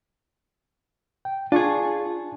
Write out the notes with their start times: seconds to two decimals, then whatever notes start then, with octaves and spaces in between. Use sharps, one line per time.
1.25 G5
1.52 D4 F4 G#4 A5 C#6